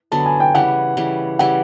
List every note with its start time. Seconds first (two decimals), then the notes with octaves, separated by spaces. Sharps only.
0.12 D3 F#3 B3 A5
0.26 G#5
0.40 G5
0.55 C#3 E3 G3 F#5
0.97 C#3 E3 G3
1.39 C#3 E3 G3 F#5